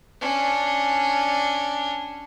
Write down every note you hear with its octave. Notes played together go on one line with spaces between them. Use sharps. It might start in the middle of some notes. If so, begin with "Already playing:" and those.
C#4 D4